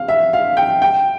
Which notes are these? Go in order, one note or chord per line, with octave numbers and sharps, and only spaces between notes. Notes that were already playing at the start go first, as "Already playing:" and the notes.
Already playing: F5
E5
F5
G5
G5